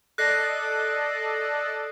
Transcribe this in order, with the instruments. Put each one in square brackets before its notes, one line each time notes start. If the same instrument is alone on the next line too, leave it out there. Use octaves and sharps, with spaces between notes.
[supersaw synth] A4 D5 D#5 [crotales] F#6 A#6 C7